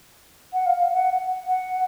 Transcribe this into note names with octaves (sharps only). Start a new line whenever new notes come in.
F#5
F5
F5
F#5
F#5